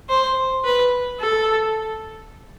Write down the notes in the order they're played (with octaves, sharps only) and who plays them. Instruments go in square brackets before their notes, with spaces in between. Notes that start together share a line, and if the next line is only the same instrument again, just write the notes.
[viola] C5
B4
A4